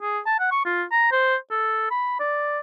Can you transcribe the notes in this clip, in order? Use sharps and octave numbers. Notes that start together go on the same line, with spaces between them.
G#4
A5
F#5
C#6
F4
A#5
C5
A4
B5
D5